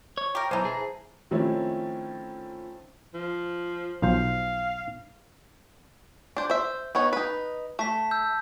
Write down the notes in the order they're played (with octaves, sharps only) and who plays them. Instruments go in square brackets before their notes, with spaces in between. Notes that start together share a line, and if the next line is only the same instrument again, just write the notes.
[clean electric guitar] C#5
[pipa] G4 A#4
[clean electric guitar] B1 [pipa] E3 G#3 [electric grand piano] C5 A5 A#5
[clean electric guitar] G#4
[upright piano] D#3 F3 A3 C4 C#4 E4
[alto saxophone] F3
[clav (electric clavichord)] B1 F3 C5 [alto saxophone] F5
[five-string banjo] D4 C5
C5 E5
B3 D#4 C#5
D#4 B4
[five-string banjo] A3 [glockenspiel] A5 B6
[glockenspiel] E6 G6